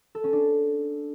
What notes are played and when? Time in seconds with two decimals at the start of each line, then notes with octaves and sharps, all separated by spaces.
0.15 A4
0.24 C#4
0.33 D4